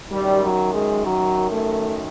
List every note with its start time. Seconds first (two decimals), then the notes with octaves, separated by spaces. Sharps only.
0.11 F#2 D#3 G3
0.43 F#3
0.73 G#3
1.05 F#3
1.52 A3